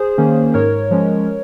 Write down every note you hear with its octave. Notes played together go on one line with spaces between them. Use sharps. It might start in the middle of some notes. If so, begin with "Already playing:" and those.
Already playing: G#4 C5
D#3 A#3 C#4
G#2 A#4 C#5
F3 G#3 C#4